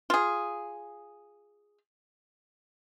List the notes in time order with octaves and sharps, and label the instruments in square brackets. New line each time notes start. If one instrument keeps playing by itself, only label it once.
[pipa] F4 G#4